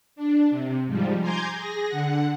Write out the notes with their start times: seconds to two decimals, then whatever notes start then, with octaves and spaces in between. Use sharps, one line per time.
0.16 D4
0.51 C3
0.87 G#2 F3 G3
1.21 G#5 A#5 C6 D6 G6 G#6
1.54 G#4 A#6
1.88 D3 F#5